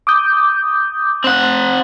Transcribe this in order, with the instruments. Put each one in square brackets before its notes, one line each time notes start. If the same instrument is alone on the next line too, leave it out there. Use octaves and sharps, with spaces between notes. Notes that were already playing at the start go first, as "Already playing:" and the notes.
[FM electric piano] D6 D#6 G6
[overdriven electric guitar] C4 F#5